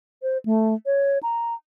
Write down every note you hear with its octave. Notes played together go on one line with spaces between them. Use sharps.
C5
A3
C#5
A#5